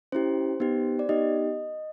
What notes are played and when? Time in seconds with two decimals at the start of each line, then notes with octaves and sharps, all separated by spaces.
0.12 C#4 E4 G4 C5
0.60 B3 D#4 G4
0.99 D5
1.09 B3 D#4 G4 D#5